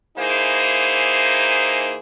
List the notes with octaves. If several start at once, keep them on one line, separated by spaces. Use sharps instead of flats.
E3 A#3 D#4 E4 G#4 C5